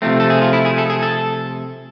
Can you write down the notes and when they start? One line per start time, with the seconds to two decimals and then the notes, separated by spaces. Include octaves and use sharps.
0.02 C3 F3 A3 C4
0.20 A4
0.30 G#4
0.41 F4
0.53 E4
0.65 G#4
0.78 A4
0.90 G#4
1.03 A4